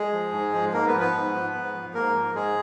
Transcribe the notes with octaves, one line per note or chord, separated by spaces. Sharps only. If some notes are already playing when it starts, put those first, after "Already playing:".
Already playing: G#3 G#4
F3
G#2
F3
G#2 A#3 A#4
B3 B4
F3
B3 B4
G#2
F3
G#2
F3
G#2 A#3 A#4
F3
G#2 G#3 G#4